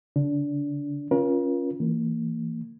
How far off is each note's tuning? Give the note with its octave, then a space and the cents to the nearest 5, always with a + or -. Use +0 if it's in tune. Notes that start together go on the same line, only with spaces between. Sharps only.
D3 -45 D4 -20
C#4 +0 F4 +0 A#4 +40
E3 +0 A#3 -30